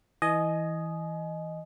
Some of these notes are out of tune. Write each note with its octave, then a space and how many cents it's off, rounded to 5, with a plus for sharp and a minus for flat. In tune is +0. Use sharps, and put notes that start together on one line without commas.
E3 -15 D#5 -5 G#5 +25